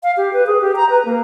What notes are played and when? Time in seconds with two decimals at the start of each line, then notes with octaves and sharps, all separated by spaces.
0.03 F5
0.17 G4
0.33 B4
0.47 G#4
0.61 G4
0.76 A#5
0.90 B4
1.05 A#3